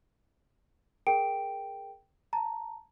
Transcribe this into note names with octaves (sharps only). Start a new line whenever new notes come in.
G#4 A#4 G5 D7
A5 A#5